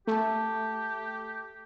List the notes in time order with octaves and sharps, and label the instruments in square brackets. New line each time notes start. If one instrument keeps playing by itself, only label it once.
[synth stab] A3 [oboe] G4 [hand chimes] A4 A5